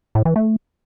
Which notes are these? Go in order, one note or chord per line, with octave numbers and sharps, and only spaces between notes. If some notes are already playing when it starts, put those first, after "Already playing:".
A2
E3
A3